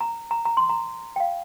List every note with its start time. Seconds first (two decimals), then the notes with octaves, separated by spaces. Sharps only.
0.01 A#5
0.31 A#5
0.45 A#5
0.57 C6
0.70 A#5
1.16 G5
1.20 F5